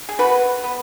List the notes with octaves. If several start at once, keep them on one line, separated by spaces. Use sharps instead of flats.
G#4
B3 F#4 B4
B3